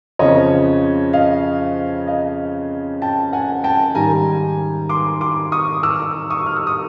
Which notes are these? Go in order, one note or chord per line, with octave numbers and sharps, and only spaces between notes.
F2 C#3 F3 C#5 D#5
D#5 F5
D#5 F5
G5 A5
F#5 G#5
G5 A5
G#2 D#3 G3 G#5 A#5
C6 D6
C6 D6
C#6 D#6
D6 E6
C#6 D#6
F6
E6
D#6